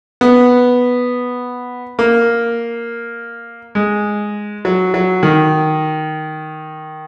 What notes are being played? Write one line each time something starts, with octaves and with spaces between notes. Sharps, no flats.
B3
A#3
G#3
F#3
F#3
D#3